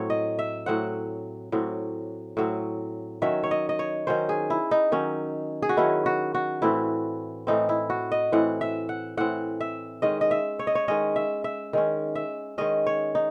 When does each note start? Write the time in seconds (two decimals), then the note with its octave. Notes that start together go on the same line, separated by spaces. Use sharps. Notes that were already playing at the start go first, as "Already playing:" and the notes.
Already playing: A2 F#3 C4 C#5
0.10 D#5
0.39 E5
0.66 A2 F#3 C4 F#5
1.52 A2 F#3 C4
2.37 A2 F#3 C4
3.22 D#3 F#3 C#4 E5
3.44 C#5
3.51 D#5
3.69 D#5
3.79 C#5
4.07 D#3 F#3 C#4 C5
4.29 G#4
4.50 E4
4.71 D#4
4.92 D#3 F#3 C#4
5.62 G#4
5.69 F#4
5.77 D#3 F#3 C#4 E4
6.06 F#4
6.35 F#4
6.62 A2 E3 C4 E4
7.47 A2 E3 C4 D#4
7.69 E4
7.90 F#4
8.12 D#5
8.32 A2 E3 C4 F#5
8.61 E5
8.89 F#5
9.17 A2 E3 C4 F#5
9.60 E5
10.02 D#3 G#3 C#4 D#5
10.21 D#5
10.31 E5
10.59 C#5
10.67 D#5
10.75 C#5
10.88 D#3 G#3 C#4 D#5
11.16 E5
11.44 E5
11.73 D#3 G#3 C#4
12.15 E5
12.58 D#3 G#3 C#4 D#5
12.86 C#5
13.15 D#4